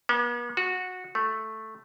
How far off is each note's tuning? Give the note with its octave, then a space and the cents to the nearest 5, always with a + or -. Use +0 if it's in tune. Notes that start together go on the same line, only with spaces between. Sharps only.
B3 -45
F#4 -15
A3 +0